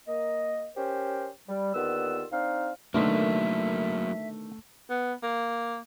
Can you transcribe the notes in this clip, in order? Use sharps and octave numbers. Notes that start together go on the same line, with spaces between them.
A#3 D#5
C#4 G4 A#4 C5
G3
D#2 D3 B3 F4 B4 E6
C4 D4 D#4 F5
B2 D3 D#3 F#3 A3 A#3 E5
B3
A#3